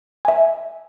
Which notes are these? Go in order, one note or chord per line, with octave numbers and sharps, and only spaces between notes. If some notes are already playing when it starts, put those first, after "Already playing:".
E5 G#5